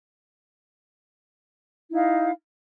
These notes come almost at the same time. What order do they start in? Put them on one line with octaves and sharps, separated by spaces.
E4 D#4 F5